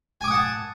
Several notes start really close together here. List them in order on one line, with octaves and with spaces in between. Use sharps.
G#5 D6 D#6 F#5 A5